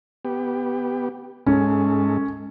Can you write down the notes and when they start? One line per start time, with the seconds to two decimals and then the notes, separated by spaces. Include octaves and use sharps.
0.25 B3 G4
1.47 G#2 G#3 C#4 A4